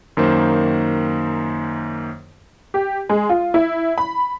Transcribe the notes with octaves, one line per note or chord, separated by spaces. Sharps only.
F#2 D#3 A#3 C5
G4
G#3
F4
E4
B5